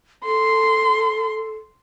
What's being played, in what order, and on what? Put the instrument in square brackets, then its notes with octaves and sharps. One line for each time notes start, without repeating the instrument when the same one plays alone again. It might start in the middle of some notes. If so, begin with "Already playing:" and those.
[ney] A4 [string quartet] C6